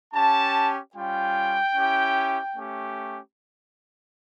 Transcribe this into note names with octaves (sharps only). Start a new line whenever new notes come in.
C#4 G4 A5
G3 C#4 F4 G5
C#4 E4 G4
A3 C#4 G4